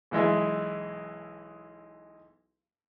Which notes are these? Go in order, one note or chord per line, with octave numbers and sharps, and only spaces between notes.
B1 E3 G#3 E5